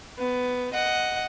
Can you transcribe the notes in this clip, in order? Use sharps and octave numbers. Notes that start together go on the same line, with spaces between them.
B3
D#5 F#5